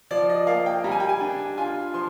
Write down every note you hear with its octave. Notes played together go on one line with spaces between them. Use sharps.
F3 D5
D#5
A#3 F5
G5
G3 A#5
G#5
G5
G#5
D4
F4 G#5
F3 C6